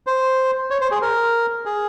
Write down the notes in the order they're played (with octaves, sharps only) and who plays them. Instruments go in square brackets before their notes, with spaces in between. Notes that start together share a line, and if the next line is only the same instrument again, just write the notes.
[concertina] C5
C#5
C5
G#4
A#4
G#4